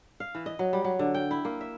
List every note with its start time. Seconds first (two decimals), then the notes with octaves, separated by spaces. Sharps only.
0.20 F5
0.35 E3
0.46 D#5
0.59 F#3
0.73 G3
0.84 F#3
0.99 D3
1.14 G5
1.31 E4
1.45 A#3
1.61 E5